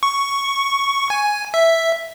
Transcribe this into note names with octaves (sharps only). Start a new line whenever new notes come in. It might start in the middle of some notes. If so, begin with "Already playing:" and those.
C#6
G#5
E5